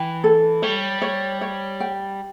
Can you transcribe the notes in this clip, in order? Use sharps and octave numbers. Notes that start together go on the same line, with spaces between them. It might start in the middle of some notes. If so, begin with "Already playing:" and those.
Already playing: E3 G5
A4
G3 C#5
C#5
C#5
G5